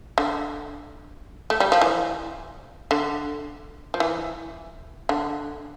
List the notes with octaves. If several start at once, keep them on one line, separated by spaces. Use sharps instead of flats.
D3
A3
G3
F3
E3
D3
F3
E3
D3